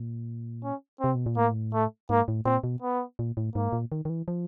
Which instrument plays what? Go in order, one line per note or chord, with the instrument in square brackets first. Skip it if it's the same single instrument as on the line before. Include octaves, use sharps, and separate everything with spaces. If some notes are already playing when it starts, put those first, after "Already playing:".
Already playing: [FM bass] A#2
[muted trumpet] C#4
[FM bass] C3 [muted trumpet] C4
[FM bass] B2
A#2
[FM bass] A2 [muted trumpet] A#3
[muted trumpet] A3
[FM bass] G#2 [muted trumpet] A#3
[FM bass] A2
[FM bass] A#2 [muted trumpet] C4
[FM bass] B2
[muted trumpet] B3
[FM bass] A#2
A2
[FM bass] G#2 [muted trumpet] A#3
[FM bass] A#2
D#3
D#3
E3
F3